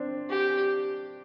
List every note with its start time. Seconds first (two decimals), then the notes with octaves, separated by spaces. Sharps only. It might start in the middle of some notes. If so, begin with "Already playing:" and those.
Already playing: C4 D4
0.30 G4